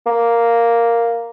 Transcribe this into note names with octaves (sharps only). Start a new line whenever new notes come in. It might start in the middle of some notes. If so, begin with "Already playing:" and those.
A#3